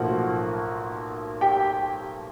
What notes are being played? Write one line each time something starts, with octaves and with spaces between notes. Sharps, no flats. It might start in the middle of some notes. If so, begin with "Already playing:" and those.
Already playing: B1 A2 F3 A#3 F#4 F#5
G4 G5